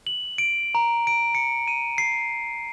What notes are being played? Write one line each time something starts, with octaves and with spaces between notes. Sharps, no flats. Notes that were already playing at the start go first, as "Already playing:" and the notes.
F#7
D7
A#5
D7
C#7
D#7
C7